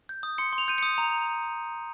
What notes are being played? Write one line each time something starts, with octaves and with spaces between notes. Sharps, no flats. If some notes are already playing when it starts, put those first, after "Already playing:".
G6
D#6
C6 C#7
C6
F7
G6 D#7
D#6 C#7
A#5